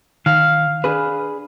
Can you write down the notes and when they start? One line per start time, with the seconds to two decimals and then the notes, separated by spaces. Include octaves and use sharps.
0.26 D#3 F5
0.84 D4 G#4 B4